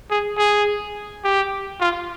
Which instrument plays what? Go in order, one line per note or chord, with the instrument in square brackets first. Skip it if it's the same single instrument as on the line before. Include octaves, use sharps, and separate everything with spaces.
[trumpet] G#4
G#4
G4
F4